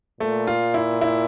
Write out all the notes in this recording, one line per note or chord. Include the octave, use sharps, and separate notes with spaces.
A#2 A3
F4
E4
E4